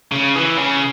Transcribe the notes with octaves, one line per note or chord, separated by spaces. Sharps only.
C#3
E3
C#3